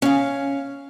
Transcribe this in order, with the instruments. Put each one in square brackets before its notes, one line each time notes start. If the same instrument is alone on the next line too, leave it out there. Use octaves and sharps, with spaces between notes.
[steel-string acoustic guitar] C#4 F5